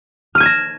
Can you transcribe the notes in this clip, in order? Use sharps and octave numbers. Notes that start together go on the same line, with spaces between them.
F6 G#6 A#6 D#7 E7